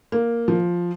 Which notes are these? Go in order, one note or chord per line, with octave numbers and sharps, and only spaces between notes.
A#3
F3